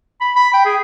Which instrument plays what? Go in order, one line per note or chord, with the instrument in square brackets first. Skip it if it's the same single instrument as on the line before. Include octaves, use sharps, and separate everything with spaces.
[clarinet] B5
B5
G5
G#4